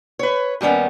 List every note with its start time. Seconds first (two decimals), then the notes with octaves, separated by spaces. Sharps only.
0.19 B4 C#5
0.61 D#2 G3 B3 C#4